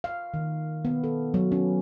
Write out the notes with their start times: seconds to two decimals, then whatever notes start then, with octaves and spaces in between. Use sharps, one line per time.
0.04 F5
0.34 D#3
0.85 B3
1.04 A4
1.34 F#3
1.52 C#4